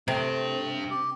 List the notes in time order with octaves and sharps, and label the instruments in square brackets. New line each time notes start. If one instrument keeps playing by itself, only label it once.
[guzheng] C3 [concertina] A3 [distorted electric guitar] D4 G5
[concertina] G4